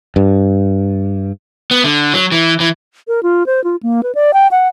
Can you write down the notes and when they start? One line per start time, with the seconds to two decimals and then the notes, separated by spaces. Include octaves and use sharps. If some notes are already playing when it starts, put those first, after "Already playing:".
0.16 G2
1.71 B3
1.84 D3
2.14 F#3
2.32 E3
2.60 E3
3.08 A#4
3.23 F4
3.46 C5
3.64 F4
3.83 A#3
4.03 B4
4.15 D5
4.34 G5
4.51 F#5